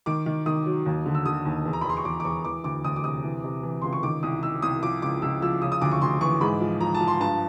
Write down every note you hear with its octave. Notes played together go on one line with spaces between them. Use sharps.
D#3 D6
D#3
D#3 D#6
F#3
D#2
D3
E6
D3 D#6
D#2
E2
A#5
B5
E2 C6
C#6
E2 D6
D6
E2 C#6
E3 D6
D2 D6
D2 D#6
D6
C3 D#6
E3
C3
E3
C#2 C6
C#6
D#3 D6
C2 D#6
D#3 E6
C2 D#6
F3 D6
C#2 D6
C#2 E6
F3 E6
C#3 D#6
D#6
D2 D6
C#6
D2 C6
E3 C#6
G#2 B5
F3
F3 A#5
A5
F3
C6
G2 A5